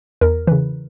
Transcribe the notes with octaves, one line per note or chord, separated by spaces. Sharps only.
E2 A#4
C#3 E3 B4